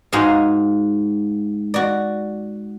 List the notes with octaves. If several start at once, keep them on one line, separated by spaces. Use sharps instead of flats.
G#2 F#4 G#4 F5 G#5
F#4 D5